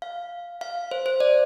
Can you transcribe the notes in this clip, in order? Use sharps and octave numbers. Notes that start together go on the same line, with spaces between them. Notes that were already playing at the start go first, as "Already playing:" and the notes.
F5
F5
C5
C5
D5